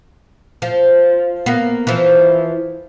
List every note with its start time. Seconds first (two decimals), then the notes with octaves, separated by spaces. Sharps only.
0.62 F3
1.46 A#3 B3
1.87 E3 F3